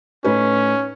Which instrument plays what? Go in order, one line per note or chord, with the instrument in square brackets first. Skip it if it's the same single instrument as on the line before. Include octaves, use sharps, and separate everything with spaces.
[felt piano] A2 D#4 B4 [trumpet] C#4